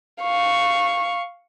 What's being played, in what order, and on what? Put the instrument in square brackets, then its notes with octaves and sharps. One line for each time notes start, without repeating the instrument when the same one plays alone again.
[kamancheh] F5 C#6